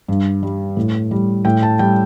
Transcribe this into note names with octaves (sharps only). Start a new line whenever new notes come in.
G2
G3
A2
G3
A2 G5
A5
G3 G5